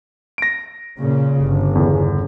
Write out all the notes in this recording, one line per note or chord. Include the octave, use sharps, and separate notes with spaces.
A#6 D7
A#2 C#3
G1
E2 C#3